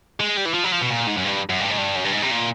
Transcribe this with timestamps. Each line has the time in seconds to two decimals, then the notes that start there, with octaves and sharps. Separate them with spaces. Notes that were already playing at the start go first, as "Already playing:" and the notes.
0.20 G#3
0.37 G3
0.46 E3
0.54 F3
0.64 F#3
0.72 F3
0.82 B2
0.90 A#2
1.07 G#2
1.17 F#2
1.25 G2
1.49 F#2
1.60 G2
1.70 G#2
1.78 G2
1.96 F#2
2.04 G2
2.12 G#2
2.22 C3
2.31 A#2